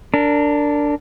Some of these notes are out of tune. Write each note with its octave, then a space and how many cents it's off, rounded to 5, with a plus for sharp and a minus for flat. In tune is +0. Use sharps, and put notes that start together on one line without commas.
D4 -5 A#4 -25